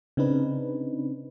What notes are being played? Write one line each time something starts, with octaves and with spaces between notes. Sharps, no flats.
C#3 C4 D4 D#4 B4